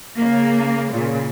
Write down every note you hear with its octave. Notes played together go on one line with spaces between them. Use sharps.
C#3 A#3
A#2 C#3